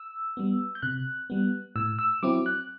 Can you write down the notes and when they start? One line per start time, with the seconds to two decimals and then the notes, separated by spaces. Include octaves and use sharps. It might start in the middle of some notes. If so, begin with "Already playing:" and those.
Already playing: E6
0.37 G3 B3
0.75 G6
0.82 C3 F#6
1.30 G3 B3
1.76 A2 E6
1.99 E6
2.23 F#3 C4 E4 D6
2.46 F#6